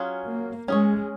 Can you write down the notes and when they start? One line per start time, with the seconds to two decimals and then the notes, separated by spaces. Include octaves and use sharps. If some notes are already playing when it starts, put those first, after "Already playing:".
Already playing: F#3 C#4 F4 G#4
0.27 A#3
0.68 G#3 C#4 G#4 C#5